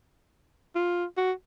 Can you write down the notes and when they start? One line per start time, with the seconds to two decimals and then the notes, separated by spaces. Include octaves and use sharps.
0.75 F4
1.17 F#4